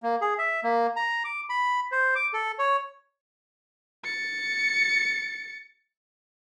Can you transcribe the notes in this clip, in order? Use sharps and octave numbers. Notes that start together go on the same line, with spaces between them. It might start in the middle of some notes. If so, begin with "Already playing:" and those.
A#3
G#4
E5
A#3
A#5
D6
B5
C5
D6
A4
C#5
A6 C#7